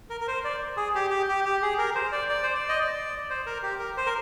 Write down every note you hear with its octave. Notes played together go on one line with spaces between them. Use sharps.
A#4
A#4
C5
D5
G#4
G4
G4
G4
G4
G#4
A#4
C5
D5
D5
C5
D5
D#5
D5
C5
A#4
G4
A#4
C5
A#4